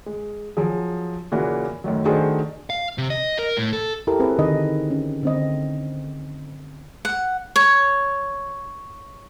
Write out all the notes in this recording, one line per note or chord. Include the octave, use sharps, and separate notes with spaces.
G#3
F3 F#3 G#4
A#2 C#3 E3 A#3 F#4
F#2 A2 D#3 F#3
D#3 A3 D4 F#4 G#4 C5
F5
C3
D#5
A#4
A2
A4
E4 G4 A4 A#4
C4 E4 G#4 B4
D3 D#3 D#4 G#4 D#5
C#4
D3 C4 D#5
F#5
C#5